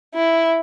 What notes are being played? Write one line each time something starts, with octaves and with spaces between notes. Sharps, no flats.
E4